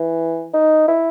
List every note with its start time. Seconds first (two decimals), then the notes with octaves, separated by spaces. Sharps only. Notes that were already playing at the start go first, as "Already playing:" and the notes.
Already playing: E3
0.54 D#4
0.88 E4